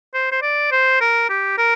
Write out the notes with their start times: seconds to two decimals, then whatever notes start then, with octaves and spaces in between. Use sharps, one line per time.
0.14 C5
0.32 C5
0.42 D5
0.72 C5
1.01 A#4
1.29 G4
1.58 A#4